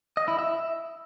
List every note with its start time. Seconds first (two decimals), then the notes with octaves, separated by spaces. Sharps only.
0.17 D#5
0.28 E4
0.39 E5